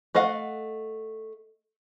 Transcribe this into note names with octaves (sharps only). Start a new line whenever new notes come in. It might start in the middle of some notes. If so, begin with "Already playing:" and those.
A3 D#5 F5 F#5